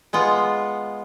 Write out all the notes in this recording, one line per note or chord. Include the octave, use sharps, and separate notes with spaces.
G#3 B3 F4